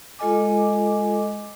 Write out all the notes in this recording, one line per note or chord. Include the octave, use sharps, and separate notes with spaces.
G#3 F4 A4 D#5 G#5 D6